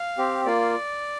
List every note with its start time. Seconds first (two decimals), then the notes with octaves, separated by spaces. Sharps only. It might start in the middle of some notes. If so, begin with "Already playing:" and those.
Already playing: F5
0.18 C4 G4
0.46 A#3 F4 D5